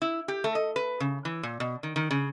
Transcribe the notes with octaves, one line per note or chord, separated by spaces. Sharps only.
E4
G4
A3
D#5
B4
C#3
E3
A#2
B2
D#3
D#3
C#3